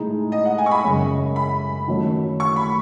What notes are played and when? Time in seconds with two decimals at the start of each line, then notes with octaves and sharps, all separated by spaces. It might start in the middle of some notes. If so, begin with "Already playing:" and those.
Already playing: A2 G#3 D#4 G#4
0.32 D#5
0.45 F#5
0.58 G#5
0.66 C#6
0.71 B5
0.84 F#2 C#3 G#3 C#4
1.36 B5
1.87 D#3 F#3 A3 C#4
2.40 C#6
2.56 B5